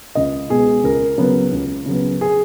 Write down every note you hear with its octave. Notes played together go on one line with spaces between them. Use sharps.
C#2 D#5
B2 G#3 B3 G#4
C#2 A#4
C#3 F#3 B3
C#2
C#3 F#3 B3
G#4